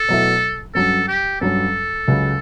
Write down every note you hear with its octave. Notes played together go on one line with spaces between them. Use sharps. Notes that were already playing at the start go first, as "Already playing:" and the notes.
Already playing: A4
B2 F#3 A3 E4
G2 F#3 C#4 A4
G4
G2 F#3 C#4 A4
C#2 C#3 F#3